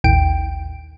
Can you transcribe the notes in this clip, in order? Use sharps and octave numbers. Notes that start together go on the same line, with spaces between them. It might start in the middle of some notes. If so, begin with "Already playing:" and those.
A1 D#2 G5 D7